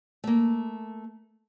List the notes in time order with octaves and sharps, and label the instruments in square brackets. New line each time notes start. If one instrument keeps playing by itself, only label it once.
[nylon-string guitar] A3 A#3